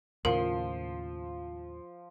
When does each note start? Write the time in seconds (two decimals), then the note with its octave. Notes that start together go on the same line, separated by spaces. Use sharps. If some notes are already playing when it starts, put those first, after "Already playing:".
0.25 D#2 A2 C#3 F3 A#4 C6